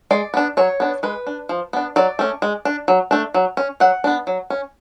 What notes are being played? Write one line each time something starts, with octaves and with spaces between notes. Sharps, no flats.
G#3 D5
B3 D4
F#3 C#5
B3 D4
G#3 B4
D4
F3
B3 D4
F#3 D5
A3 C#4
G#3
D4
F#3
A3 D4
F#3
C#4
F#3 F#5
B3 D4
F#3
C#4